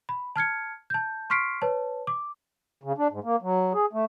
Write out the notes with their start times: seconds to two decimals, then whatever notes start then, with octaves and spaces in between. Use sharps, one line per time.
0.09 B5
0.36 A5 F6 G#6 C#7
0.90 A5 G6
1.30 C6 C#6 F6 B6 C7 D7
1.62 B4 C#5 A5
2.07 D6
2.83 C#3
2.98 D4
3.12 G#2
3.24 A#3
3.42 F#3
3.74 G#4
3.93 A3